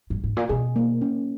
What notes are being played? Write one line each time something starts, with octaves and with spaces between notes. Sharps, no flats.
G2
G#2
A#2
B2 G#4
A#3
C#4